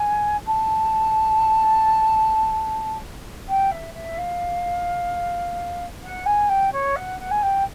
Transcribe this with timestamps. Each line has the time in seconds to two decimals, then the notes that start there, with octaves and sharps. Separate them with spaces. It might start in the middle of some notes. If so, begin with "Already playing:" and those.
Already playing: G#5
0.46 A5
3.48 G5
3.71 E5
3.94 E5
4.17 F5
6.03 F#5
6.26 G#5
6.49 G5
6.72 C#5
6.96 F#5
7.19 F#5
7.31 G#5
7.42 G5